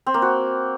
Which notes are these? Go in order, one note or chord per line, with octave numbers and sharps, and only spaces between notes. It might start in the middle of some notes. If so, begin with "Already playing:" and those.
C4
A#3
F#4